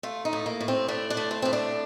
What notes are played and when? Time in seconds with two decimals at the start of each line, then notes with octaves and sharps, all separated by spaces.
0.03 A3 F4
0.25 D#4
0.33 A2
0.46 A#3
0.60 A2
0.68 C4
0.88 A3 D4
1.10 D4
1.17 A3
1.31 C4
1.42 A2 C4
1.53 D4